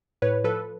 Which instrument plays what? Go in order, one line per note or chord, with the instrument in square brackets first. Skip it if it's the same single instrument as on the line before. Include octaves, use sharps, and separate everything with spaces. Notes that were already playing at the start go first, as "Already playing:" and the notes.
[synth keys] A2 B4 C#5
F3 A4 B4